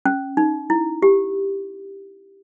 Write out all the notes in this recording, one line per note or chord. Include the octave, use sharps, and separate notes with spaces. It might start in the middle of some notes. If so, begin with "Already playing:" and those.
C#4
D#4
E4
G4